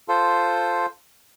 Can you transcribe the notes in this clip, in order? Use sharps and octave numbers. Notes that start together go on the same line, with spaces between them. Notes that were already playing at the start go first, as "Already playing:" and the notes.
F4 A4 C5